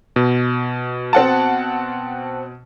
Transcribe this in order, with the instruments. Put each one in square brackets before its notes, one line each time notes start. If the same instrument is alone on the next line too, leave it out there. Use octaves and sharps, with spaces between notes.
[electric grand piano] B2
[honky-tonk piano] C4 F#5 A5